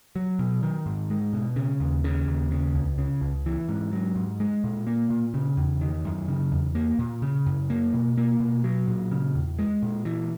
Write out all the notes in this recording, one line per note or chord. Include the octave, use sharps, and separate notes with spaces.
F#3
B2
D#3
G#2
G#3
B2
C#3
D#2
C#3
D#2
C#3
C#2
C#3
C#2
E3
G#2
F#3
G#2
G#3
A#2
A#3
A#2
C#3
E2
D#3
F#2
C#3
E2
A#3
A#2
C#3
F#2
A#3
B2
A#3
B2
F#3
A#2
C#3
E2
G#3
A#2
E3